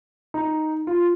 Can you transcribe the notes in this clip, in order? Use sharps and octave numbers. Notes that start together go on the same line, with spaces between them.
D#4
F4